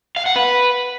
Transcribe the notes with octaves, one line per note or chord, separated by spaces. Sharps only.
F5
F#5
B4